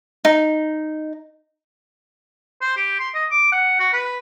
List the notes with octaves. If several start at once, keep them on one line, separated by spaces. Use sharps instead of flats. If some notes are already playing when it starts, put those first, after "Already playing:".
D#4
C5
G4
C6
D#5
D6
F#5
F#4
B4